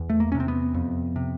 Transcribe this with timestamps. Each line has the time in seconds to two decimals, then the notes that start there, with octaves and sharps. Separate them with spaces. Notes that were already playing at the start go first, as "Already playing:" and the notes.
Already playing: E2
0.10 A3
0.20 A#3
0.32 C#4
0.35 C3
0.40 C4
0.48 B3
0.74 F2
1.16 C3